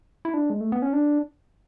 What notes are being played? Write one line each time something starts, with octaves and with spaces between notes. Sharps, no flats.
E4
D4
G#3
A3
B3
C#4
D4